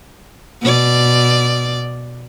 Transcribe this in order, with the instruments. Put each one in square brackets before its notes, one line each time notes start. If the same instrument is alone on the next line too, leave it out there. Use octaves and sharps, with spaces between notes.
[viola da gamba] B2 D5